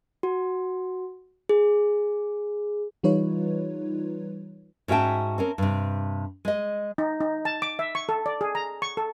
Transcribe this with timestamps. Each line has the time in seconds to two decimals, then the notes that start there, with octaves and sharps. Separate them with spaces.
0.23 F#4
1.49 G#4
3.03 E3 G3 D#4 F4 B4 C#5
4.88 G#2 C#4 F#4 E5 G5 A5
5.38 C4 C#4 A#4
5.58 G2 C3
6.45 G#3 D#5
6.98 D#4
7.21 D#4
7.45 A5
7.62 D6
7.79 E5
7.95 C#6
8.09 A4
8.26 D5
8.41 G#4
8.55 A#5
8.82 C#6
8.97 A4